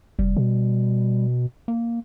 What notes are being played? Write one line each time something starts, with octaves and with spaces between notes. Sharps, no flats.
F1 G3
B2
A#3